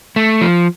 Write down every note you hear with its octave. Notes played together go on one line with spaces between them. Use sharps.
A3
F3